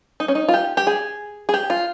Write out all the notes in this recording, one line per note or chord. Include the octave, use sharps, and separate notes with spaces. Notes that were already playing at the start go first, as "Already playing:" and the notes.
D#4
C#4
D#4
F4
G4
G4
G#4
G#4
G4
F4